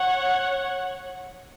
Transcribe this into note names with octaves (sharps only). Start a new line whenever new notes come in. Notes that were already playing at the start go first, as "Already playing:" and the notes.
Already playing: C#5 F#5